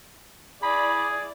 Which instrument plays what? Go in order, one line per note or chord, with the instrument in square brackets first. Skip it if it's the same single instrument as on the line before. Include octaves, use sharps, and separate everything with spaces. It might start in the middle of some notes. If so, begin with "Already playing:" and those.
[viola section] E4 D5 [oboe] G#4 [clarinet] B5